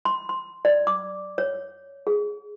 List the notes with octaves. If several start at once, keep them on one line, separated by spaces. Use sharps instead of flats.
C6
C6
D5
D6
C#5
G#4